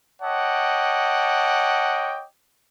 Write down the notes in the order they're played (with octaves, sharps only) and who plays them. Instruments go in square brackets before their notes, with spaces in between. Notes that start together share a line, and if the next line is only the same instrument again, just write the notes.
[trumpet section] C#5 D#5 F#5 G5 A5 D6